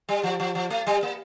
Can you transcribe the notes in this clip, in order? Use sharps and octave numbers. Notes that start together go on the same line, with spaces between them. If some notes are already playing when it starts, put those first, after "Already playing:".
G3
F3
F3
F3
A3
G3
A#3